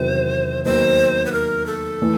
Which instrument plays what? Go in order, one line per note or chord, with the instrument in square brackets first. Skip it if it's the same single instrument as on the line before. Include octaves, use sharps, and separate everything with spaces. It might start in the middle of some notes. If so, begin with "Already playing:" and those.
Already playing: [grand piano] E2 C3 D#3 F#3 [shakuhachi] C5
[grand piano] D#2 D#3 F#3 B3 D#4 [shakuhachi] C5
[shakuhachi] B4
A#4
A4
[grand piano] E3 A3